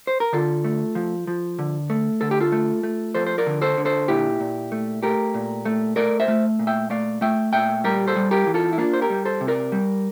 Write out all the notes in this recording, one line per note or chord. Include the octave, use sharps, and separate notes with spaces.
C5
A#4
D3 F4 A4
A3
F3
F3
D3
A3
D3 A4
G4
F4 A4
A3
A3
F3 A4 C5
C5
A#4 D5
D3
A4 C5
D3
A4 C5
A#2 E4 G4
A#2
A3
A3 G4 A#4
A#2
A3
A3 A#4 D5
C5 E5
A3
A#2
E5 G5
A3 D5 F5
A3 E5 G5
A#2 E5 G5
G3 G4 A#4
A4 C5
G3
G4 A#4
E3
F4 A4
E4
A#3 D4 F4
C5
G4 A#4
G3
A4 C5
C3
A#4 D5
G3